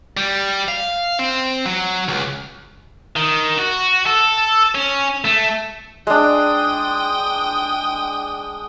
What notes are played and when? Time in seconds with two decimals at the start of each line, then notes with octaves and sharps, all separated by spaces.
0.17 G3
0.68 F5
1.19 C4
1.66 F#3
2.08 C#2
3.16 D#3
3.58 F#4
4.06 A4
4.75 C#4
5.25 A3
6.07 G#3 D4 G5 D#6